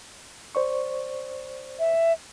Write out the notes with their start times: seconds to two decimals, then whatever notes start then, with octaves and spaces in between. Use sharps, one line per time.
0.55 C5 D5 C#6
1.79 E5